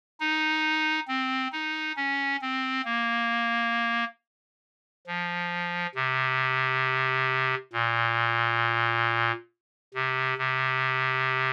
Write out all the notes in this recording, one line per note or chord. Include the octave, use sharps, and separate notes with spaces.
D#4
C4
D#4
C#4
C4
A#3
F3
C3
A#2
C3
C3